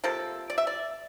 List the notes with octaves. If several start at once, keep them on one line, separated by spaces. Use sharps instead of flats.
C3 F3 A#3 A4
D5
E5
D5